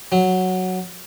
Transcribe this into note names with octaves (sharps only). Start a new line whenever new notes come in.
F#3